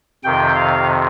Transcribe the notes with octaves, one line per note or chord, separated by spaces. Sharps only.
F2 C3 D#3 G5
F5